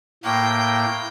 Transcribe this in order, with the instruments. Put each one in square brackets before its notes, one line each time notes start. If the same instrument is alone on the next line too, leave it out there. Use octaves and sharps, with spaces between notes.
[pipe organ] A2 A#3 [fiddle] G5